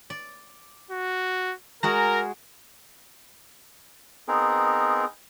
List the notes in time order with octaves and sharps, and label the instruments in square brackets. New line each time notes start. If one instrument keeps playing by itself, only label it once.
[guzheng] D5
[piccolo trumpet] F#4
[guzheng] G#3 F#4 G#4 [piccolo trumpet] A#4 [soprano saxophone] A#5
[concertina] B3 C4 D#4 G#4 A#4